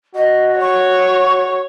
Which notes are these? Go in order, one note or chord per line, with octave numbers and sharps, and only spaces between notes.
F#4 D#5
C#5 C#6